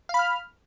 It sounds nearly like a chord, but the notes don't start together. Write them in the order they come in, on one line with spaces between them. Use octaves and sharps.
F5 B5 F6